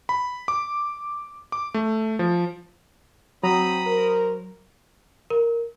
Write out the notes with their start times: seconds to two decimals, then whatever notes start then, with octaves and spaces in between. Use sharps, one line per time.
0.09 B5
0.48 D6
1.52 D6
1.74 A3
2.19 F3
3.43 F#3 C4 A#5 B5 D#6
3.86 A#4 C5
5.30 A#4